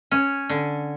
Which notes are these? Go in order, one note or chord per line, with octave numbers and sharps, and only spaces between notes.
C#4
D3